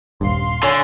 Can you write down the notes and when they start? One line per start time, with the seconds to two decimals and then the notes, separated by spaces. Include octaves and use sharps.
0.21 D#1 G#1 G2 F5 C6
0.63 D3 C#5 G#5